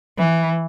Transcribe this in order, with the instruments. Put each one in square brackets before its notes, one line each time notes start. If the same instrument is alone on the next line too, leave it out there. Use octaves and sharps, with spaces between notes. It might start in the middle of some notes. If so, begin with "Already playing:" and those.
[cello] E3